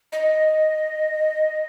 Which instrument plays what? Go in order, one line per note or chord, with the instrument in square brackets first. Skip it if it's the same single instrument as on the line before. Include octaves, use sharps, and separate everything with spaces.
[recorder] D#5